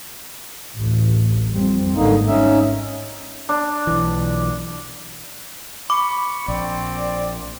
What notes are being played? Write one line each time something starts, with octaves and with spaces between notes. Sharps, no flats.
A1 D2
F2 G3 C4
G#1 G#2 D3 A#3 D#4
C#4 D#4 E5
D4
B1 E3
B5 C#6 D6
A#1 C4 D5